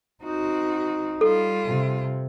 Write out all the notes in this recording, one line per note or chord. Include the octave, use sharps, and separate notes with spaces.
C4 D#4 F#4
G3 F4 A4
C3